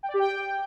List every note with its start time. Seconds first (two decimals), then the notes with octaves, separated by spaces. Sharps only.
0.03 G5
0.08 D5
0.14 G4
0.19 G5